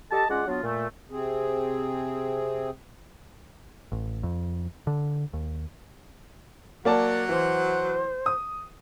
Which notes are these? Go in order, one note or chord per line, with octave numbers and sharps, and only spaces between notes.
G4 A4 D#5 A5
G#3 C#4 F4 D5 F#5
F#3 B3 D4 F4
A#2 A3
C3 C4 G#4
A1
F2
D3
D#2
F#3 A#3 D5 F#5 A5
E3 C5
D#6